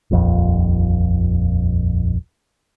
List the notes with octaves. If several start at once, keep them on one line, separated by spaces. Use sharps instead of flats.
D#1 A#1 F2